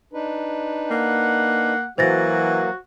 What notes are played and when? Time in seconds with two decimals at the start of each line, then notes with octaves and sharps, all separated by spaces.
0.13 D4 D#4 B4
0.91 A#3 F#5
1.98 E3 F#3 A#3 F#4 C5 A6 A#6